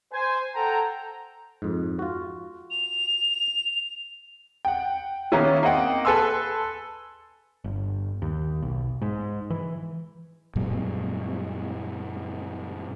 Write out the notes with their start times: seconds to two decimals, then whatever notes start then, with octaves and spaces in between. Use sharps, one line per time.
0.13 C5 G#5
0.55 A4 C5 F#5 G5 A5 A#5
1.62 F2 G#2
1.99 F4 F#4
2.71 F7
4.65 F#5 G5
5.32 D#3 A#3 B3 C#4 E4
5.63 A#3 C4 D#5 F#5 G5
6.05 A4 B4 G#5 C6 E6
7.64 G1
8.22 D#2
8.62 B1
9.02 G#2
9.50 E3
10.55 F#2 A#2 F#3 G3